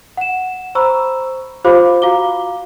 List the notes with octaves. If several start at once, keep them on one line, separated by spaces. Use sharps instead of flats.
F#5 E7
C5 A#5 B5 C#6 E6
F4 G4 C5 F5 B5 D6
F#4 F5 A#5 D6 G7